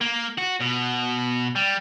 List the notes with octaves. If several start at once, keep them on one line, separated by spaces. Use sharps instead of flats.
A#3
F#4
B2
G3